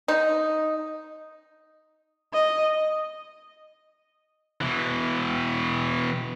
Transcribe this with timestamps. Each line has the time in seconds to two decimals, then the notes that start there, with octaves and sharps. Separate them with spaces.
0.08 D#4
2.34 D#5
4.61 B2 E3